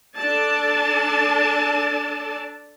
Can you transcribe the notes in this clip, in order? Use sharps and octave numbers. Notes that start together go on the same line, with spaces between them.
D4 A4 D5 A5